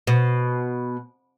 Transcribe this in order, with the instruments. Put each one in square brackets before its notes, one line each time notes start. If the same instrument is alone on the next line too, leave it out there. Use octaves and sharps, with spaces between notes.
[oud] B2